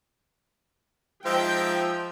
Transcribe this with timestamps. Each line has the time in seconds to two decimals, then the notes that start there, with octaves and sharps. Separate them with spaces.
1.26 F3 G#3 D#4 E5 G5